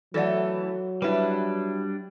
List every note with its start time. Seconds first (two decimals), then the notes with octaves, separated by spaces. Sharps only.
0.14 E3 F#3 A3 A4 D5 F#5
1.02 G3 D4 E4 B4